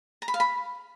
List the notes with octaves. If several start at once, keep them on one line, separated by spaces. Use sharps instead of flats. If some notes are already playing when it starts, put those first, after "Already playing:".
A#5
B5
F5
B5